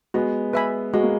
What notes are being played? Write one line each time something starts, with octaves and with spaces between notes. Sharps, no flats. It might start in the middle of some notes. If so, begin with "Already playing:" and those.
G#3 B3 F#4
B4 E5 G#5 B5
G#3 F#4
A#3